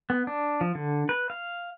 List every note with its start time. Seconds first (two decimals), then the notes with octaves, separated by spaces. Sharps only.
0.10 B3
0.27 D4
0.61 F3
0.75 D3
1.09 B4
1.30 F5